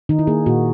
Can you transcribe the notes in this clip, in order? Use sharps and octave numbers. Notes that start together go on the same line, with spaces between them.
D#3 D#4
E4
A#3 G#4
A#2 F#4